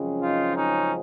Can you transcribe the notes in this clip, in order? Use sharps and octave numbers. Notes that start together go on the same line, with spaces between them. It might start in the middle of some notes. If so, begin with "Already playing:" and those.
Already playing: F#2 C#3 F3 G#3 C4
D#4 F4
C#4 D#4